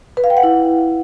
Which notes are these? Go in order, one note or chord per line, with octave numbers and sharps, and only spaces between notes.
B4
F5
G5
F#5
E4